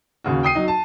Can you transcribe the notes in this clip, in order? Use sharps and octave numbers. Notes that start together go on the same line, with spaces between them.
D#2 C#3 F#4
G5 D#6 C7 D#7
F#3 D#4
A5